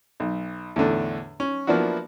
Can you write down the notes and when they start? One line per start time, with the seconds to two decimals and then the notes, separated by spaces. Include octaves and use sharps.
0.20 B1
0.76 E2 A2 D3 A3
1.40 C#4
1.67 F3 A#3 B3 D4 E4 F#4